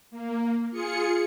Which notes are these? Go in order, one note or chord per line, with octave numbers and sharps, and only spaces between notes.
A#3
F4 G#4 C#7